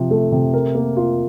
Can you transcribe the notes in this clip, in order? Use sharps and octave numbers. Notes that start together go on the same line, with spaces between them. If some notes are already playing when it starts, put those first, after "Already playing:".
Already playing: C3 F3
A3
C3
A#4
A#3
F4